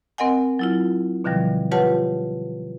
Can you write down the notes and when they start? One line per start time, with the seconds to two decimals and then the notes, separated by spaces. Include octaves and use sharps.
0.18 C4 A#4 D#5 F#5 G#5
0.59 F#3 E4 F4
1.24 B2 D3 D#3 F3 G3
1.72 F4 G4 B4 C#5 F#5 A5